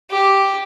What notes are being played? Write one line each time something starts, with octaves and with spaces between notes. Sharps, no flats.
G4